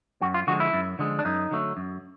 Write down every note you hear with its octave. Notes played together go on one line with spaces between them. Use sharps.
F#2 F#4
F4
D3 F3 G#3 F#4
E4
F#2
D3 F3 G#3
D4
F#2 D#4
D3 F#3 A3
F#2